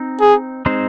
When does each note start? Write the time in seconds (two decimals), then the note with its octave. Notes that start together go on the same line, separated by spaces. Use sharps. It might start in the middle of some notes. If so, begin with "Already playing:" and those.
Already playing: C4 D#4
0.20 G#4
0.66 G#3 C4 D#4 C5